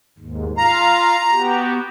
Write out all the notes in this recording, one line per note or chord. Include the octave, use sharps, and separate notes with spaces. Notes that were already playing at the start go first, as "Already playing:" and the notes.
D#2 G#2
F4 F5 A#5
B3 F#4 G4